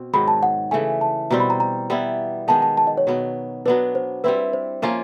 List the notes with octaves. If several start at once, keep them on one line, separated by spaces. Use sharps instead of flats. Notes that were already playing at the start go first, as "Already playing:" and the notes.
Already playing: B2 C4
G#2 D#3 F#3 B5
A5
F#5
C#3 E3 A3 G#5
A5
B2 G3 C4 A#5
B5
A#5
A#5
G3 B3 E4
D#3 G#3 B3 A5
A5
A5
D#5
C#5
B2 F#3 B3
F#3 B3 D4 B4
C5
G3 C4 E4 B4
C5
F3 A#3 C#4 F4